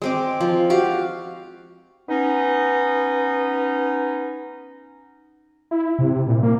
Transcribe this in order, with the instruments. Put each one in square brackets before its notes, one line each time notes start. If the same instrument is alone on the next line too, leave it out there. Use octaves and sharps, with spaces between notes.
[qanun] G#3 C4 D6
F3
F#4 G4 F5
[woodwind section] B3 C#4 D#4
[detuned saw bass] E4
C3
A#2
A#3